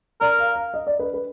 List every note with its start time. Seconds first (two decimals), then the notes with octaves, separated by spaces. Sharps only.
0.21 A#4 D5
0.39 F5
0.56 F5
0.74 D#5
0.87 D5
0.99 B4
1.14 B4